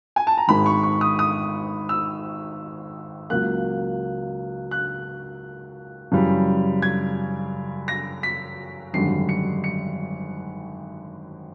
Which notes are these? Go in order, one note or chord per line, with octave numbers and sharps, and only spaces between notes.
G#5
A5
A#5
G#1 G#2 D#3 G#3 B5
C#6
C#6
D#6
D#6
E6
C#2 C#3 F#3 A#3 F#6
F#6
F#2 C#3 E3 G3
G#6
A#6
B6
G#1 F#2 D3 G3 C7
C#7
C#7